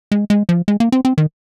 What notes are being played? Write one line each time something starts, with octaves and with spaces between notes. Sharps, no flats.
G#3
G#3
F3
G#3
A#3
C4
C4
D#3